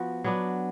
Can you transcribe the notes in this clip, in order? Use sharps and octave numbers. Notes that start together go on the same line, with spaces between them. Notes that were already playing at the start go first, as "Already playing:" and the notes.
Already playing: F3 B3 F#4
F#3 B3 D4